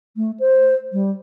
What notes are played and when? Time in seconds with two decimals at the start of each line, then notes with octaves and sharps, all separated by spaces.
0.16 A3
0.39 C5
0.92 G3